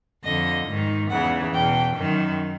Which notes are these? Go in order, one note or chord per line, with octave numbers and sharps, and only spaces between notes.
F2 D3 D#5
G#2 D#3
E2 C#3 E3 F#5
E2 B2 G5
F#2 D#3